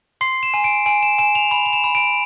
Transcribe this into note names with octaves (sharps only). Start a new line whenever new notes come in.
C6 C7
E7
G#5
D7
G#5 D7
E7
G#5 E7
F7
B5 F7
F7
E7
B5
D7